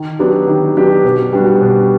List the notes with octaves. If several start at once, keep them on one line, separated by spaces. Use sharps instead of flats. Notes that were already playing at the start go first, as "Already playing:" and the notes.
Already playing: D#3
F#3 B3 D4 G4
D#3
F#3 B3 D4 G4
B2
G3 B3 D4 F#4
B2